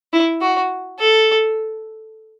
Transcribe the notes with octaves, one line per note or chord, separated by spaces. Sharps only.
E4
F#4
A4